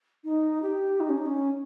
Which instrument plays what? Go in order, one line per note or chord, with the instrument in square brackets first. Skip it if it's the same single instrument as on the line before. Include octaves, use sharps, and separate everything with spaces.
[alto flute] D#4
G4
D#4
C#4
D#4
C#4